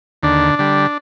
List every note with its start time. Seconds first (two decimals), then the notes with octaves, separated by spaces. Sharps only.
0.23 D#2 D3 D4
0.59 D3 G3